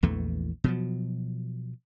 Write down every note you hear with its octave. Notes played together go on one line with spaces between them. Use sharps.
A#1 E2 E3 A3
B2 F3 F#3